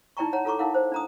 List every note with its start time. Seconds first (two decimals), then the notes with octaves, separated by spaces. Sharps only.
0.17 D#4 E4 D5 G5 A#5 C#6
0.33 C#5 F#5 A#5
0.45 F4 A4 A#5 C#6 D6
0.59 D#4 E4 A#4 F5 F#5
0.75 C5
0.92 D4 A#5 D#6